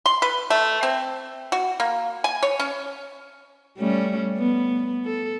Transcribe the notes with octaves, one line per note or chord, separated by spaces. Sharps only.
C6
B4
A3
C4
F#4
A#3
G#5
C#5
C#4
G3 A3 C#4
B3
A4